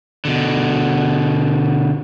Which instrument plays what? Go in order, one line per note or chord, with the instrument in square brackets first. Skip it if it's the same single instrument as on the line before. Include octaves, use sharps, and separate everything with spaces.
[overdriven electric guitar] B2 D3